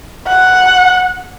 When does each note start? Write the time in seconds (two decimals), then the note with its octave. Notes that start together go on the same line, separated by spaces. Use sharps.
0.27 F#5